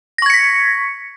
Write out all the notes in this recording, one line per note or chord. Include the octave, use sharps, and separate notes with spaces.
C#6 G#6 A#6 B6 C#7